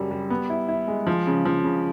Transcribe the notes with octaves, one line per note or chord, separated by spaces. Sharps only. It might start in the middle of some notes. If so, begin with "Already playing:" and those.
Already playing: F#2 C#3 G3
G3
B3
E4
E4
G#3
F3
C#3
F3
C#3